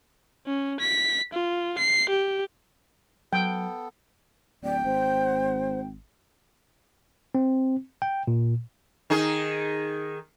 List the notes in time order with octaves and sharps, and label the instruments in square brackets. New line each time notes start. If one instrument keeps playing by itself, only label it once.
[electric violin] C#4
B6
F4
C7
G4
[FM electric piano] F#3 [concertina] B3 A4 [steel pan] G5
[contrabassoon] D1 [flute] D5 [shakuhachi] G5
[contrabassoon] G#1 [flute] C5
[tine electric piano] C4
G5
A#2
[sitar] D#3 D#4 G#4